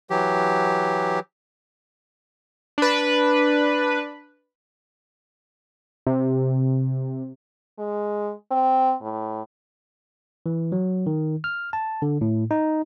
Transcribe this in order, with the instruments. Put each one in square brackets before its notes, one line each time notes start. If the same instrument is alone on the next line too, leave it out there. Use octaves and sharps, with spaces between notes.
[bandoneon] E3 F#3 G4
[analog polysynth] D4 B4
[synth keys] C3
[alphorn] G#3
C4
A2
[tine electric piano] E3
F#3
D#3
F6
A5
D3
A2
D#4